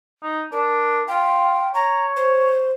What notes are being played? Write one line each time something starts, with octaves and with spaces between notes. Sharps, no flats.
D#4
D4 A#4
F4 G5
C#5 A#5
C5